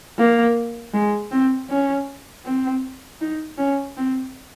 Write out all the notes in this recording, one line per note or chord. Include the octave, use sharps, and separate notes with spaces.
A#3
G#3
C4
C#4
C4
D#4
C#4
C4